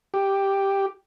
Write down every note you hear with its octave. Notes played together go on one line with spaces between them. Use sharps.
G4